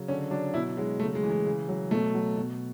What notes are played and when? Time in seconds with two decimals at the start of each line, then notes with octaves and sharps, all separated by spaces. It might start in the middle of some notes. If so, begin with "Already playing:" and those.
Already playing: C#3 F#3
0.08 D3 C#4
0.31 F#3 D4
0.54 B2 E4
0.77 F#3 G#3
1.00 C#3 A3
1.15 G#3
1.23 E3
1.31 G#3
1.45 C#3
1.68 F#3
1.91 B2 A3
2.14 F#3
2.37 B2